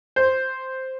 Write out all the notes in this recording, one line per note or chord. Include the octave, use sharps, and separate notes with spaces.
C5